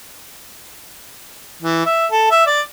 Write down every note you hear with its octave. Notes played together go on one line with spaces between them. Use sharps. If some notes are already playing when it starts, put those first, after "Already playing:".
E3
E5
A4
E5
D5